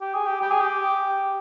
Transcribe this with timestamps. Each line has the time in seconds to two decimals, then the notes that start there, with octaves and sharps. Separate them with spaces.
0.01 G4
0.14 G#4
0.27 G4
0.41 G4
0.51 G#4
0.61 G4